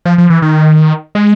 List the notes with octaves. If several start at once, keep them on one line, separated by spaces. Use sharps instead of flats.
F3
F3
E3
D#3
G#3